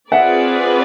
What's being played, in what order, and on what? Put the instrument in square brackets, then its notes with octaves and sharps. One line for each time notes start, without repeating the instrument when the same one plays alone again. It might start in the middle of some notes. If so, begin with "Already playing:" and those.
[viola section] C4 F4 G#4 B4 D5 [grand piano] E5 F#5